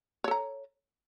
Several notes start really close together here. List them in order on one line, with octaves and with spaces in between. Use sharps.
C#5 A4 A#5